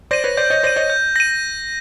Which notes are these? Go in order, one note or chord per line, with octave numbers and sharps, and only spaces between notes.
C5 D5 A#6 D#7
B4 C#5
C5 D5 G6
C#5 D#5
C5 D5 A#6 D#7
C#5 D#5
G6
A#6 D#7